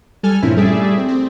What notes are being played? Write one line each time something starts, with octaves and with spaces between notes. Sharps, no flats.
G3 A4 G#5 F6
G2 A#2 F3 C4 C#4 E4
G3 A3 G#4 D5 E5
C4
C4